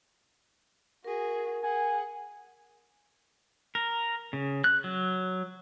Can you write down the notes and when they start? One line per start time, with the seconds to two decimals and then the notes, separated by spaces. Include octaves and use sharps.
1.04 F#4 G#4 A#4
1.63 G#4 F#5 G#5
3.75 A#4
4.33 C#3
4.64 F#6
4.84 F#3